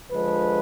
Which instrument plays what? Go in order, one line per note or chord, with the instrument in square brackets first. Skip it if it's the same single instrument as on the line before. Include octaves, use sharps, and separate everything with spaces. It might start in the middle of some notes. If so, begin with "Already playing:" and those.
[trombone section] D3 F3 G#3 B4